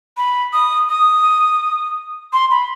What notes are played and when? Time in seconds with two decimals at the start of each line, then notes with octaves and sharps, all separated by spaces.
0.17 B5
0.53 D#6
0.89 D#6
2.33 C6
2.51 B5